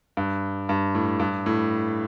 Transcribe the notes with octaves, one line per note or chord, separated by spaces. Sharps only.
G2
G2
A2
G2
A2